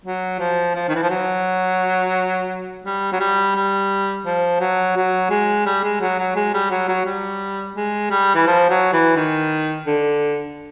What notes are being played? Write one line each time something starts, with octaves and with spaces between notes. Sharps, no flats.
F#3
F3
F3
D#3
E3
F3
F#3
G3
F#3
G3
G3
F3
F#3
F#3
G#3
G3
G#3
F#3
F#3
G#3
G3
F#3
F#3
G3
G#3
G3
E3
F3
F#3
E3
D#3
D3